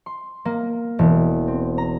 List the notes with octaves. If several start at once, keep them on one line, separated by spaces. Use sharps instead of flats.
C6
A#3
E1
C4
A#5